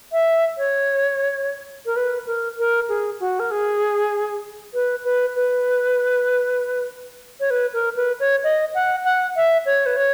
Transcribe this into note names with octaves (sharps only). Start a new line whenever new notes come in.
E5
C#5
A#4
B4
A#4
A#4
G#4
F#4
A#4
G#4
B4
B4
B4
C#5
B4
A#4
B4
C#5
D#5
F#5
F#5
E5
C#5
B4
C#5